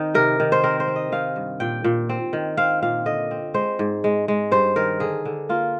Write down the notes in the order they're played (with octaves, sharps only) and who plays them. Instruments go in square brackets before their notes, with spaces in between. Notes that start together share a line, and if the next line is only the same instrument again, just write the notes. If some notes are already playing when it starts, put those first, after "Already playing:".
Already playing: [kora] D#3 C4 D#4
C3 A#4
D#3
C5
C4 A#4
C5
C4
D#5
D#3 F5
G2
A#2 G5
A#2
C4
D#3
C4 F5
A#2 F5
D3 D#5
C4
G#3 C5
G#2
G#3
G#3
G2 C5
D#3 A#4
D3 G#4
D3
A#3 F4